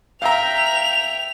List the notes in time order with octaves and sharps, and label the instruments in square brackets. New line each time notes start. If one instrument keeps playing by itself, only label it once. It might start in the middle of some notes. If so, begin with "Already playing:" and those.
[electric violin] E5 G5 [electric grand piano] F5 A#5 [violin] F7